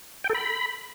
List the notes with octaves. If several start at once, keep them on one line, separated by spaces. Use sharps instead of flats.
G5
A4
B5